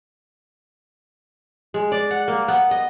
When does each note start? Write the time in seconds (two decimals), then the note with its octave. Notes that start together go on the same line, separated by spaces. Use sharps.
1.74 G#3
1.92 D5
2.11 F#5
2.28 A#3
2.48 B3
2.71 D#5